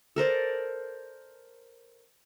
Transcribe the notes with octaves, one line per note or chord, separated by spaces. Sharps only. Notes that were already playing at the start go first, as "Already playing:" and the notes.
A4 A#4 C5 D5